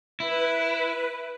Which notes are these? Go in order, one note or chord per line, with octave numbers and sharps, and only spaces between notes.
E4 B4